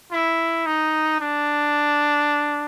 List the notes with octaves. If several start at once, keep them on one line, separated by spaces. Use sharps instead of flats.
E4
D#4
D4